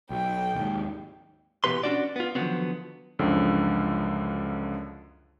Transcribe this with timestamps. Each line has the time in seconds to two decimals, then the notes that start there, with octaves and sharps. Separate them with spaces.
0.10 B1 G5
0.55 D#2 G#2
1.64 B2 E3 B3 G4 B4 C6
1.83 C#4 D4 F#4 D5
2.16 B3 F4
2.35 D3 D#3 F3 F#3 B3 C4
3.19 C#2 F#2 D3 F3